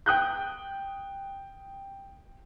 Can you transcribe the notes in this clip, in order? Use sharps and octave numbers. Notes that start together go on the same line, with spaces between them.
G5 D#6 F#6 G6